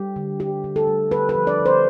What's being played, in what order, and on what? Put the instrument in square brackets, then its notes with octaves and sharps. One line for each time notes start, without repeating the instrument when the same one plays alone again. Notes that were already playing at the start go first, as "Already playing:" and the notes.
Already playing: [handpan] G3 G4
D3
G3 G4
D3
A4
G3
D3 B4
B4
F3
D5
D3
C5